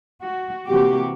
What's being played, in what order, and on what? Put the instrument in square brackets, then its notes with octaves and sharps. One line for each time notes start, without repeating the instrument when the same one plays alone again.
[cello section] F#4
C3 E3 A#3 F#4 G4